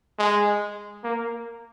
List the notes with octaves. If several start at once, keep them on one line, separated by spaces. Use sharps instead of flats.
G#3
A#3